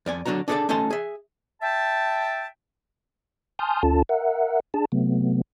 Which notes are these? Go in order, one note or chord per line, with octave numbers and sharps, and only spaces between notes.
F2 D5 G#5
D3 F#3 D4 F#4 A#5
D4 G#4 A4 B4 D5 A5
A3 C#4 D#4 A4 A5 C6
G#4 E5
E5 G5 A5
G#5 A5 C6 D#6 F6 G6
D2 C#4 F4 A4 A5
A#4 E5 F#5
D4 G#4 A5
C3 F#3 A3 B3